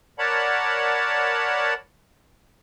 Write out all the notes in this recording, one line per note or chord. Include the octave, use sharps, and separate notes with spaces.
A#4 C#5 D5 F#5 A5 B5